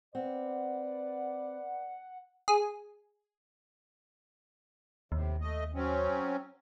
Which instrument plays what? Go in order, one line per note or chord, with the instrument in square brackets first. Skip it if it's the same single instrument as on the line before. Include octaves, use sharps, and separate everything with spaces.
[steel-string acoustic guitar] C4 [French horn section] B4 D5 [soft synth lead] F#5
[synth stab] G#4
[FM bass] D#2 [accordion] A2 C3
[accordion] A3 D#5
F#3 C4 C#4